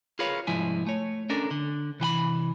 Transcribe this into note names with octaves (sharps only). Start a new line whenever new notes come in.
F4 G#4 A#4 B4 C#5 F5
C2 G#2 F3 E4 G#5
A3 C#5
C#4 D4 A4 A#4
D3
C3 E3 G5 B5